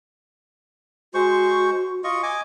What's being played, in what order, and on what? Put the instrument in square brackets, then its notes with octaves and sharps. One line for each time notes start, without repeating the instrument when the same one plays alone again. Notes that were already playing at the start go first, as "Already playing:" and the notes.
[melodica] G#3 C5 C#6 [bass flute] F#4
[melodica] F4 D#5 C#6
D#5 G#5 D6